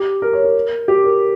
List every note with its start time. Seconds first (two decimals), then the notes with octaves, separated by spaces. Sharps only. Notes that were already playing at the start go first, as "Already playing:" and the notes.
Already playing: G4
0.22 A#4
0.33 C#5
0.44 A#4
0.88 G4
1.04 A#4